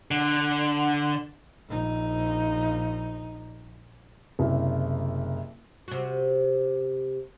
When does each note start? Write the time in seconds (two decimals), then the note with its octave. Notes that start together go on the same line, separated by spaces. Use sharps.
0.11 D3
1.69 A#1 D#4
4.39 F#1 C2
5.88 C3 F#4